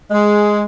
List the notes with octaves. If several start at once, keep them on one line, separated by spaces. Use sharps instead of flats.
G#3